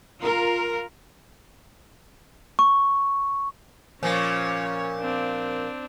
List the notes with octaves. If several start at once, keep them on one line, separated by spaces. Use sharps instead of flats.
F4 A#4
C#6
A#2 F3 C#4 C#5
C4 D4